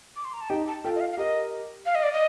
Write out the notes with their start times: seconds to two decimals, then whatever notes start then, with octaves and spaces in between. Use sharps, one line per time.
0.16 D6
0.25 C6
0.34 A#5
0.41 A5
0.50 D#4 G4 G5
0.68 A5
0.84 F4 A4 G5
0.96 D#5
1.00 F5
1.12 F5
1.17 G4 A#4 D#5
1.86 F5
1.95 D#5
2.03 D5
2.13 D#5